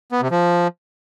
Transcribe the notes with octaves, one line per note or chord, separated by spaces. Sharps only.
B3
C3
F3